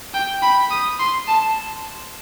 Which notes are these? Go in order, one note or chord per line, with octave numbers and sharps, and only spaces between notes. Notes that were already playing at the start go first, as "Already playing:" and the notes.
G5
B5
D#6
C6
A5